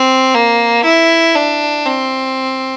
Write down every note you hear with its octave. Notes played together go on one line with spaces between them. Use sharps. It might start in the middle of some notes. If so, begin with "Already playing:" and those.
Already playing: C4
A#3
E4
D4
C4